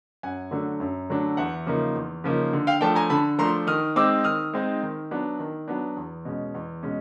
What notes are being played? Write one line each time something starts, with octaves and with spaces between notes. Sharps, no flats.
F#2 F#5 G#5
D3 F#3 A3 D4
F#2
D3 F#3 A3 D4
E2 E5 F#5
C#3 F3 A#3 D#4
E2
C#3 F3 A#3 D#4
D3
F5 G5
F3 A3 D4 G5 A5
G#5 A#5
D3 A5 B5
F3 A3 D4 A#5 C6
D#3 D#6 F6
G#3 C4 D#4 D6 E6
D#3 D#6 F6
G#3 C4 D#4
D#3
F#3 B3 D4
D#3
F#3 B3 D4
E2
B2 G#3 C#4
E2
B2 G#3 C#4